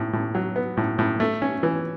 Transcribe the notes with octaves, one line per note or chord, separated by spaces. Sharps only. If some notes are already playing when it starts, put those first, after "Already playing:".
Already playing: A2
A2
F#3
B3
A2
A2
A3
C#4
E3